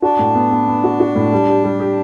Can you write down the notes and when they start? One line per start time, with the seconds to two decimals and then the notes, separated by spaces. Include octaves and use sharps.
0.02 D4 F#4
0.19 A2
0.35 B3
0.51 B3
0.68 B3
0.84 F#4
1.00 F#4
1.15 A2
1.32 G3
1.48 G4
1.64 G3
1.80 G4